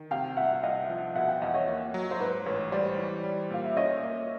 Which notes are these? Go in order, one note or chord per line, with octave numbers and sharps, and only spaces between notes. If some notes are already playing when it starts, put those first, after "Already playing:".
Already playing: D#3
C3 F5 G5
C2 E5 F#5
E5
C2 D#5 F5
F3
B2 E5 F#5
F5 G5
E2 D#5 F5
C#5 D#5
A#3
F#3
C5
G#2 B4
A1 B4 C#5
G3 C5 D5
E3
G3
A#2 F5
E5
C#4 C#5 D#5
A#3